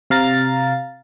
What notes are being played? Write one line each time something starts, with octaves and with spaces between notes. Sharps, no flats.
C3 F5 A#5 A6